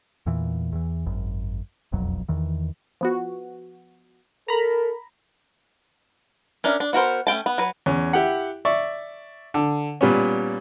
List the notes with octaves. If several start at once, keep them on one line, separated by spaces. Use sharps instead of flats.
E2 A#2 E3
E2 E3
G#1 F#2
E1 B1 F2 F#3
E2 D#3 E3
F3 B3 F#4
A4 A#4 A#5 B5
C#4 D4 A#4 E5
D4
B3 F#4 A#4 C5
A3 C#4 G5 A5
B3
F#3 B4
E2 C#4
E4 G4 F#5
D5 E5 C#6
D3
A#2 G3 B3 C#4